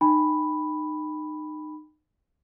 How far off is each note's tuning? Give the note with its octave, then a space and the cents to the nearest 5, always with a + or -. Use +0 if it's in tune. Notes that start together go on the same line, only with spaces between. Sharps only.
D#4 -30 G5 +40 B5 +0